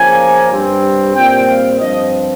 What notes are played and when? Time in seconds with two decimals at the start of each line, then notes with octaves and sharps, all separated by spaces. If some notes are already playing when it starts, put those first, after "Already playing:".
Already playing: C#3 F3 A#3 G#5
0.51 G2 G3 C4
1.15 A#2 G3 C4 G5
1.47 F5
1.80 G2 F3 C4 D#5